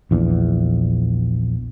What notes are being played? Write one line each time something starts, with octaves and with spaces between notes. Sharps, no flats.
A#1 E2